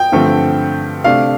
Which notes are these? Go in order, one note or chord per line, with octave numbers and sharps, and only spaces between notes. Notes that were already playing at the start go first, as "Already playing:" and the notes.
Already playing: G5
G2 D3 F3 A3 C4
C3 A3 D4 F5